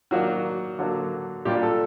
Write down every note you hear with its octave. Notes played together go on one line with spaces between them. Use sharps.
D#3 F#3 A#3 D4 F#4
D3 F#3 A#3
A#2 G3 D4 G4
A4